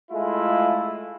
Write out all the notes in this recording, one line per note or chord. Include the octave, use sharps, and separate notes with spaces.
G#3 A3 E4 F4